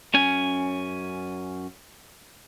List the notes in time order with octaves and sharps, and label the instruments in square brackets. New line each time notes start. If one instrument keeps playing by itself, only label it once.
[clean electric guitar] F#2 C#4 G#5